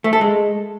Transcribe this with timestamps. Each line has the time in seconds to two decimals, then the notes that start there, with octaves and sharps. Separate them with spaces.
0.04 A3
0.13 A4
0.21 G#3